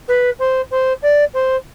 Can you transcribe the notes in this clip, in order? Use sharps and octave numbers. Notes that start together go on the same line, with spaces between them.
B4
C5
C5
D5
C5